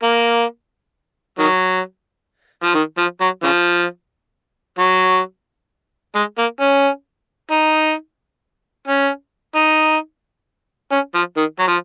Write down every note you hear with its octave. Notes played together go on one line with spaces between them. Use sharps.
A#3
D#3 F#3
F3
D#3
F3
F#3
C#3 F3
F#3
G#3
A#3
C#4
D#4
C#4
D#4
C#4
F3
D#3
F#3
F3